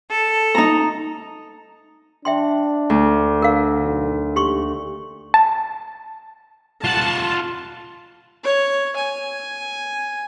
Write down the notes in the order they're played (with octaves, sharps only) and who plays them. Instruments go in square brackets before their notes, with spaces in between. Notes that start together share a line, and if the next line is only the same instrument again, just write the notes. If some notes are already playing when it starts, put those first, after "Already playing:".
[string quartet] A4
[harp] D#4 A#5
[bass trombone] D4 [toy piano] E5 G5 C6
[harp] D2
[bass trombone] D3 [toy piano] A#4 F5
[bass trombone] B1
[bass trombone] D#2 [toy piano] G4 C6 C#6
[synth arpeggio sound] A5
[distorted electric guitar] F4 F#5 [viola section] A5
[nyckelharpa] C#5
G#5